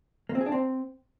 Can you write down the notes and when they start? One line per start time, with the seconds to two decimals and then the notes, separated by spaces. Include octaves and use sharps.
0.29 A#3
0.35 C4
0.41 G#4
0.46 D4
0.52 C4